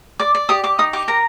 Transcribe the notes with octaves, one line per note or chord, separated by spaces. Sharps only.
D5 D6
D5
G4 D#6
G4 D6
D#4 D#6
G4 D6
A#4 A#5